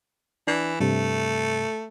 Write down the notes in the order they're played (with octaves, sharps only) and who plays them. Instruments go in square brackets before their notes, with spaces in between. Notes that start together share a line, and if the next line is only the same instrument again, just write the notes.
[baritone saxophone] E3 [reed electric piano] D4
[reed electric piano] G2 C3 [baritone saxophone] A3